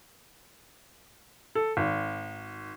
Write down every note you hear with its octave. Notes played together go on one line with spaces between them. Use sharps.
A4
G#1